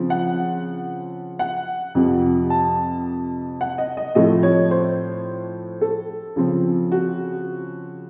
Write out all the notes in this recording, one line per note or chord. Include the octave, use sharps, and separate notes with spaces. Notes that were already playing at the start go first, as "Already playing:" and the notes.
Already playing: C#3 F3 C4
F#5
F#5
F2 C3 F3
A5
F#5
D#5
D#5
A2 F3 A3 C4 D#5
C#5
C5
A4
C#3 F3 C4
F#4